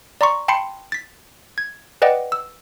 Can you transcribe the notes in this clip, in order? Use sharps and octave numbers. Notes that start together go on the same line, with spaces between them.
D5 A#5 C6 C#6
G5 A5 B5 C6 C7 C#7
A6 B6
G#6
B4 D5 D#5 F#5 G5
E6